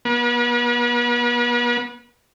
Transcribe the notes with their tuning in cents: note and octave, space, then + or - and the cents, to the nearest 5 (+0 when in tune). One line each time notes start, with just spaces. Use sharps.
B3 -40